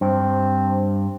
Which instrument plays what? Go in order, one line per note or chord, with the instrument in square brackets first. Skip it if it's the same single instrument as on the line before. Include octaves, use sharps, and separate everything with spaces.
[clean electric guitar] G2 [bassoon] C4